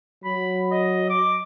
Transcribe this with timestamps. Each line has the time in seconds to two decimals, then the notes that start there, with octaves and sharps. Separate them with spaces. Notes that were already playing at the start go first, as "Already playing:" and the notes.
0.24 F#3 B5
0.71 D#5
1.10 D6